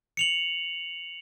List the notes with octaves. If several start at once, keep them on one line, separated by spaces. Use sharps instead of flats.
C#7 F7 F#7